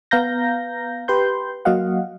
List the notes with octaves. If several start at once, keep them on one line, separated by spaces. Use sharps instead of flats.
B3 F5 A#5 G6 A#6
G4 B4 C6 G6
F#3 A#3 F#4 D#5 F5 F#5